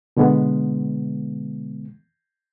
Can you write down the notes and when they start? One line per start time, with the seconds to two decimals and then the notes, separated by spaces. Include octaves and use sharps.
0.17 B2 D3 G#3 B3